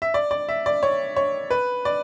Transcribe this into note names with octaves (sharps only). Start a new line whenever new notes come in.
E5
D5
D5
E5
D5
C#5
C#5
B4
D5